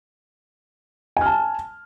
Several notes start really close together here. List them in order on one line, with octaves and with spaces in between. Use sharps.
G#5 F6 A5